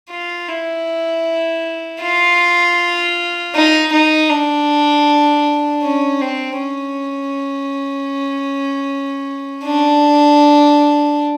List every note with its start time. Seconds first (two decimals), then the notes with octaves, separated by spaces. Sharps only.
0.10 F4
0.48 E4
2.02 F4
3.54 D#4
3.92 D#4
4.30 D4
5.83 C#4
6.21 C4
6.59 C#4
9.64 D4